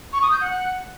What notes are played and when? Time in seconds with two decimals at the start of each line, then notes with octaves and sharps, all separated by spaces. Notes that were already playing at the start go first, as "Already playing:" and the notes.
0.13 C#6
0.22 D#6
0.32 G6
0.41 F#5